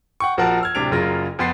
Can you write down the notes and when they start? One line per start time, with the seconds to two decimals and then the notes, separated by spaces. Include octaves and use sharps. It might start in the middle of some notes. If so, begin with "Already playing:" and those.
0.20 F#5 G5 C#6
0.38 A#1 F3 F#4 A#4 F#5 A5
0.61 E6 F6 G#6
0.75 D1 C3 D4 D7 F7
0.91 F#1 F#2 C#3 F4 A#4 A#6
1.39 F2 F3 B3 C6 A6 C7